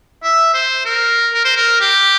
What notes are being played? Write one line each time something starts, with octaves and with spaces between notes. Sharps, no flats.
E5
C5
A#4
A#4
C5
A#4
G4